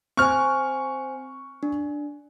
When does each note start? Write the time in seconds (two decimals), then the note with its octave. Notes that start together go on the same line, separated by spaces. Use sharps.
0.17 C4 C5 G#5 C#6 F6
1.63 D4